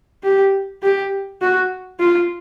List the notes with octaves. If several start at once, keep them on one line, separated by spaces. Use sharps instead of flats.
G4
G4
F#4
F4